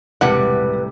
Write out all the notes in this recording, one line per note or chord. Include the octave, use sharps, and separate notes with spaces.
E1 A2 C3 G3 A#4 B4 F#5 A5